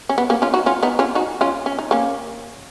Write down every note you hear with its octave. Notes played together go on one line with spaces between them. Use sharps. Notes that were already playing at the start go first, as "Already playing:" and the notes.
C#4
B3
A#3 C#4
C#4 F4
D#4 F#4
C#4 F4
B3 D#4
C#4 F4
D#4 F#4
C#4 F4
C#4
D#4
A#3 C#4